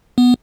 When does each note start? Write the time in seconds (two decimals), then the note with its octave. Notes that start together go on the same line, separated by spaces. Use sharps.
0.18 B3